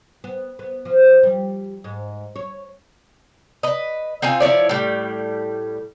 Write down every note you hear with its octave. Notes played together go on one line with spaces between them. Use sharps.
B3
B3
F3
G3
G#2
C#5
B4 D#5
C4 D#4 F4 G#5
F3 E4 C#5 D5
A2 G3